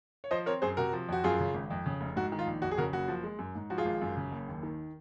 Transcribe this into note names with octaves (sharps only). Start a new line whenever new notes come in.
C#5
F3 C5 D#5
C4 A#4 C#5
F#2 G#4 C5
C3 F#4 A#4
F3
F2 F#4
F#2 F4 G#4
C#3
G#1
F2
C#3
F1
G#2 F#4
D#3
F4
A#1
F2 F#4
G#4
C#3 F#4 A#4
F#1 F#4
F3
G#3
F#2
G#2
F3 F#4
F4 G#4
G#1
F#2
C#3
F#1
D#2
D#3